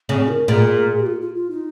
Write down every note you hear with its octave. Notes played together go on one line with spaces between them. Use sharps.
C#3 C4
A#4
A#2 G#4
G4
F4
F4
F4
D#4